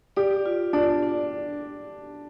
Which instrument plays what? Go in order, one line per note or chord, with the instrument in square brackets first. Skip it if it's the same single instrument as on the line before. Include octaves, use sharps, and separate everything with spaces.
[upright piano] G4 [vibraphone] D5
[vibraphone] F4
[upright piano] D4 [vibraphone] D5
[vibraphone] D4